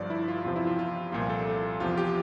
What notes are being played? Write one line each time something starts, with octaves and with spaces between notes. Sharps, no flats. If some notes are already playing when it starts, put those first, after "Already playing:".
Already playing: G1 G2 F3 D5
E4
F4
E2 C3 F3 F4
E4
F4
F4
C2 A#2 F3 F4
A4
E2 C3 F3 F4
G4